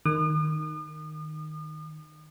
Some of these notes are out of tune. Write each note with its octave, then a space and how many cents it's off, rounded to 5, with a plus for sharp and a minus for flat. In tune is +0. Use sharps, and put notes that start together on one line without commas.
D#3 -10 D#6 -40